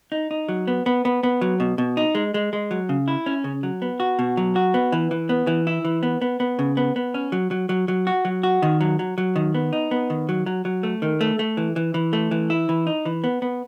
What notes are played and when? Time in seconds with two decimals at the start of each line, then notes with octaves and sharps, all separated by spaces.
0.12 D#4
0.31 D#4
0.49 F#3
0.67 B3
0.86 B3
1.05 B3
1.23 B3
1.41 F#3
1.60 B2
1.78 B2
1.97 D#4
2.15 G#3
2.34 G#3
2.53 G#3
2.71 F#3
2.89 C#3
3.08 E4
3.26 C#4
3.44 C#3
3.63 F#3
3.82 B3
4.00 F#4
4.19 B2
4.37 F#3
4.56 F#4
4.74 B3
4.92 E3
5.11 E3
5.29 B3
5.47 E3
5.67 E4
5.85 E3
6.03 B3
6.21 B3
6.40 B3
6.59 C#3
6.77 B3
6.96 B3
7.14 C#4
7.32 F#3
7.51 F#3
7.69 F#3
7.88 F#3
8.07 F#4
8.25 F#3
8.43 F#4
8.62 D#3
8.81 F#3
8.99 F#3
9.18 F#3
9.36 D#3
9.55 B3
9.73 D#4
9.91 B3
10.10 D#3
10.29 F#3
10.46 F#3
10.65 F#3
10.83 A3
11.02 D#3
11.21 A3
11.39 A3
11.57 E3
11.76 E3
11.94 E3
12.13 A3
12.31 E3
12.50 E4
12.69 E3
12.87 D#4
13.05 E3
13.24 B3
13.42 B3